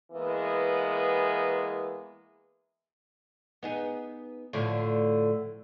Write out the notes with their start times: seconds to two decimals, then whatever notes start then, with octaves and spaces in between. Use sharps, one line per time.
0.12 E3 G#3 A#3 B3
3.63 B3 D#4 G#4
4.53 A2 D3 F3